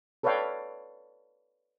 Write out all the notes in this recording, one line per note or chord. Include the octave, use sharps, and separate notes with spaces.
A4 B4 C#5 D5 F5 G5